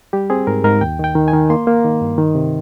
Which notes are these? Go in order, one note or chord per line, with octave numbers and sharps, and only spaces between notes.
G3 G4
C4 G#4
G#2 A#4
G#2 A#4
D#2 G5
D#3 G5
D#3
G#5
D#3
A#3 C6
A#3
D#3
G2
D#3
C3